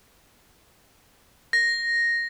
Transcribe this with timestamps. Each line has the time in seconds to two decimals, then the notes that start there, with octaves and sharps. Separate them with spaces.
1.53 A#6